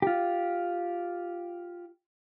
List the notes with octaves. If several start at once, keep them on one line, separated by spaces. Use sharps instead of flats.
F4 G4